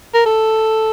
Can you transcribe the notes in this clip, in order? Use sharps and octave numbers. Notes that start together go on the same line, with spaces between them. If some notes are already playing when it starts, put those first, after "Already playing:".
A#4
A4